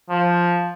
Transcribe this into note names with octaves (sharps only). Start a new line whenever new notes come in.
F3